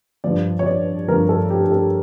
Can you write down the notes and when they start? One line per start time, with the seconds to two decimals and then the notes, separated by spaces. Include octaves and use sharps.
0.24 G2 F3 D5
0.59 C#5
0.66 D5
1.08 G2 F3 A#4
1.29 A4
1.50 G4
1.64 G4
1.72 A4